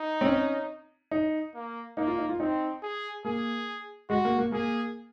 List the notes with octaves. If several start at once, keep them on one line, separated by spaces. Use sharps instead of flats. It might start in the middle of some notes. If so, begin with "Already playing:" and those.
Already playing: D#4
C4
C#4
D#4
A#3
A#3 D#4
F4
D#4
F4
C4 D#4
G#4
A#3 G#4
G#3 F#4
A#3
A#3
A#3 G#4